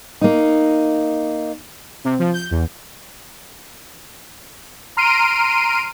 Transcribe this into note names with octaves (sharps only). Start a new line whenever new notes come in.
A#3 D#4
C3
F3
G6
E2
A#5 C6 F6 C7 D7 D#7